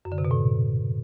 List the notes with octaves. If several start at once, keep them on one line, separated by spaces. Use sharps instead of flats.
F#2
D3
C3
B2
A2